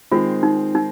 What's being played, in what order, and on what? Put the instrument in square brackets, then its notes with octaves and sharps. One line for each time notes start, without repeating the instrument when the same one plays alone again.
[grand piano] D#3 G#3 C4 [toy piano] F4
[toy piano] D#4
D#4